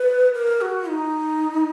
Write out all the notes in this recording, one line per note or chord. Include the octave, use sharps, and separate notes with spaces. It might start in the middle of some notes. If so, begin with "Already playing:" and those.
Already playing: B4
A#4
F#4
D#4